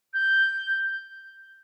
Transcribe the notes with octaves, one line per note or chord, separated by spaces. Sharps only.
G6